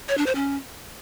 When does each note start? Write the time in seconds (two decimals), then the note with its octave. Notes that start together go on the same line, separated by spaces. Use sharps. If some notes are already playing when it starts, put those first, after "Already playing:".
0.09 C#5
0.17 D4
0.26 C5
0.35 C#4